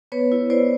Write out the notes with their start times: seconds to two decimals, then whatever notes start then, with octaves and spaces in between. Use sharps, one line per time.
0.12 B3 B4 C#5
0.32 E4
0.50 E4 C5 D5